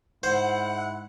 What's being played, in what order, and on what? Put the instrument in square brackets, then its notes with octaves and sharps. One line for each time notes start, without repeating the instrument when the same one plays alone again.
[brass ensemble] G#2 E4 [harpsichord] C5 [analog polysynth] F#5